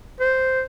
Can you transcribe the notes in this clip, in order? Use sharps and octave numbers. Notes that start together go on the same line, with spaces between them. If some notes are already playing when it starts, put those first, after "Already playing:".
C5